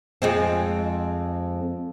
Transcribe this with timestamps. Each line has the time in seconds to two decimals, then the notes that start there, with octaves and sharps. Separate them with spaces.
0.22 F2 G#3 C4